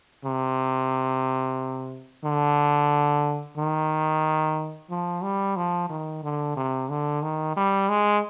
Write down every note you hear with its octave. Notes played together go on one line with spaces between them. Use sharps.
C3
D3
D#3
F3
G3
F3
D#3
D3
C3
D3
D#3
G3
G#3